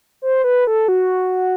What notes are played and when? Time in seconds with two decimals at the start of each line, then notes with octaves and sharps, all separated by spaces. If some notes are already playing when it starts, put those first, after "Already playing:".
0.22 C5
0.44 B4
0.67 A4
0.88 F#4